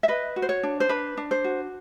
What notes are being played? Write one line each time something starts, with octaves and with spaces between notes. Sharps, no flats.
E5
B4 D#5
F#4
C5
C#5
D4
C5
D4 B4
D4
C5
F#4